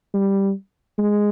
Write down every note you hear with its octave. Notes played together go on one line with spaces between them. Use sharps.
G3
G#3